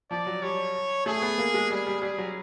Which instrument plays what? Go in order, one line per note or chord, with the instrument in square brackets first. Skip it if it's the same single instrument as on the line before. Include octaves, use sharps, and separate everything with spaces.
[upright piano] F3 [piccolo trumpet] D5
[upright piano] F#3
[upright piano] G3 [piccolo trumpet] C#5
[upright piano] A3 [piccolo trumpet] G#4
[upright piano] B3
A#3
G#3
[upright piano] G3 [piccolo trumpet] G#4
[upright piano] G3
[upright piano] G3 [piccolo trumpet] G#4
[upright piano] F#3